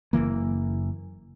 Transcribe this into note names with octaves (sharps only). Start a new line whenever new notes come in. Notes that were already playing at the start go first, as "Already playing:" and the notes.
F#1 D#2 E3 A#3